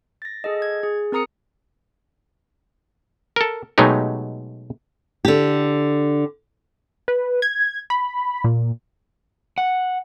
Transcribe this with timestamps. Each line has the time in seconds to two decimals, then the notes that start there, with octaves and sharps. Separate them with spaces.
0.22 A6 A#6
0.44 G#4 A4 D#5
0.62 G#6
0.83 G#4
1.12 C4 A#4 A#5 D#6 C#7
3.36 A4 A#4
3.78 B2 F#3 G#3 A3 D#4 G4
5.25 D3 G4
7.08 B4
7.42 G#6
7.90 B5
8.44 A#2
9.58 F#5